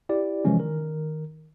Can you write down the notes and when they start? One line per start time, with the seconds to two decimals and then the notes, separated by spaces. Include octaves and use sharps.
0.09 E4 G4 D5
0.45 C3 E3 F3 G#3 C#4
0.57 D#3 A#4